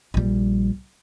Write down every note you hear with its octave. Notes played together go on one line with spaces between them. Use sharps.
A#1 G3